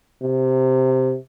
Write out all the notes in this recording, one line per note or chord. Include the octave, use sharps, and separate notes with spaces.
C3